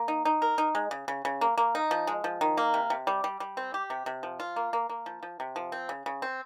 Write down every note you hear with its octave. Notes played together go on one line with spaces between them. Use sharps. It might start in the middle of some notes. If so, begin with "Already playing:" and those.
Already playing: A#3
D#4
D#4
A#4
D#4
G#3
C#3
C#3
C#3
A#3
A#3
D#4
F3
G#3
F3
D#3
A#3
C3
C3
G3
G3
G3
C4
G4
C3
C3
F3
F4
A#3
A#3
A#3
F3
F3
C3
F3
C4
C#3
C#3
C4